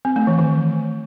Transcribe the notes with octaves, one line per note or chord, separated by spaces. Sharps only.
C4
A3
E3
D#3